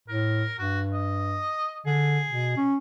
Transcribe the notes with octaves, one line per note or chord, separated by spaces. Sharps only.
A2 A#4
G2 F#4
D#5
D3 G#4
B2
C#4